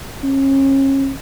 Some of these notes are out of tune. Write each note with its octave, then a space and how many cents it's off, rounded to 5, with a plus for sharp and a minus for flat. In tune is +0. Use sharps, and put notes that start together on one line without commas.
C#4 -35